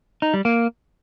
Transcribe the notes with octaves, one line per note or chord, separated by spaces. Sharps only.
D#4
G3
A#3